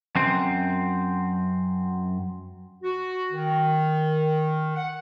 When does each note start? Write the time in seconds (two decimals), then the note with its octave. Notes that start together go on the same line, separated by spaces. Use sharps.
0.16 F#2 C4
2.83 F#4
3.32 D#3
4.76 F#5